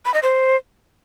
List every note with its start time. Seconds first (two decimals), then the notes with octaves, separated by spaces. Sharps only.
0.05 B5
0.14 D#5
0.23 C5